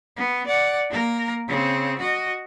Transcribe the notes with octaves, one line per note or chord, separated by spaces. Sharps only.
B3
D5 F#5
A#3 A#4
C#3 C4
F#4 D#5